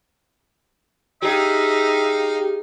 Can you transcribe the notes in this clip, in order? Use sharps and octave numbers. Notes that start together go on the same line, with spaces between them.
D#4 G4 G#4 E5 F5